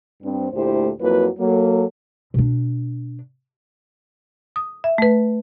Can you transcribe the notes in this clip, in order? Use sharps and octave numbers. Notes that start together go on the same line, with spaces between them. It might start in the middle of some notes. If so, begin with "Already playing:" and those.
G2 C4
D2 A#2 A3 E4 G4 C5
F2 F#3 A#3 E4 F#4 B4
F#3 A#3 A4
B2 D4
D#6
E5
A3 B4